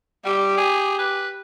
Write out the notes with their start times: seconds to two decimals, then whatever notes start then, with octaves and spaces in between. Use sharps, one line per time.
0.25 G3 G4
0.57 G#4
0.99 B4